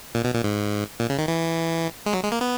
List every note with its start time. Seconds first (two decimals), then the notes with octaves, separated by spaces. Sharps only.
0.15 A#2
0.24 B2
0.34 A#2
0.44 G#2
1.00 A#2
1.10 C#3
1.19 D#3
1.28 E3
2.06 G#3
2.13 F#3
2.23 G#3
2.32 A#3
2.41 B3